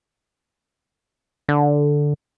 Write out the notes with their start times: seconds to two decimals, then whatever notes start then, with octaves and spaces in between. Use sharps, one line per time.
1.49 D3